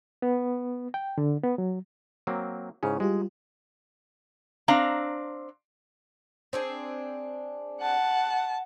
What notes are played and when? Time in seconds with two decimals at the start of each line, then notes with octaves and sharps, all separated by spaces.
0.22 B3
0.94 G5
1.18 D3
1.44 B3
1.58 F#3
2.27 F#3 A#3 C4
2.83 G#2 C#3 C#4 E4 C5
3.00 G3 G#3 F4 G4
4.68 C4 D4 F5 A#5
6.53 C4 D4 G#4
7.82 F#5 A5